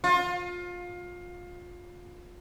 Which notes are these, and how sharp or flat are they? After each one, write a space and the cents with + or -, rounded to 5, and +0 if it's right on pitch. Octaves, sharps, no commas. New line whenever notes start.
F4 +25